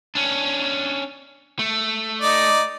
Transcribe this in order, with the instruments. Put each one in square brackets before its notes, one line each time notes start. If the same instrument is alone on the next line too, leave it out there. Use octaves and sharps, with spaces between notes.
[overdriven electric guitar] C#4 D4
A3
[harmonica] D#4 D5